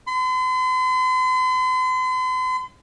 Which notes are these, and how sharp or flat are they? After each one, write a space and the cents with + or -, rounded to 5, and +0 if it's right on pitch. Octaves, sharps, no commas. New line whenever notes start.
C6 -45